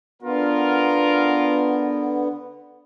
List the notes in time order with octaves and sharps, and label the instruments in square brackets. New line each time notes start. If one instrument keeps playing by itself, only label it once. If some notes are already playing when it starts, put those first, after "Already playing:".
[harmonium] D3 B3 [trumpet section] F4 A#4